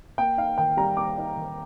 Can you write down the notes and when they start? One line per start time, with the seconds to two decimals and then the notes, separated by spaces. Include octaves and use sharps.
0.18 A#3 G5
0.37 D#4 F5
0.58 D#3 G5
0.77 G3 A#5
0.97 A#3 D6
1.17 D#4
1.37 D#3